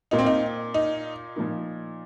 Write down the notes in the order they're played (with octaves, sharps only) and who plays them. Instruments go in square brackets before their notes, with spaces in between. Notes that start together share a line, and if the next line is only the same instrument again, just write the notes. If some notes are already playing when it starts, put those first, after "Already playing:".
[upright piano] A#2 A#3 F4 [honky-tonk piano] D#4
[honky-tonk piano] C4
D#4
D#4
[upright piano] A#2 F3 A#3 D#4